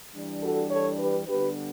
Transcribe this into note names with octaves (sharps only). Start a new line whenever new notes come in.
E3 G3 D4
F#4 A4
A4 C#5
G4 B4
D3 G3 B3 D4 G4 B4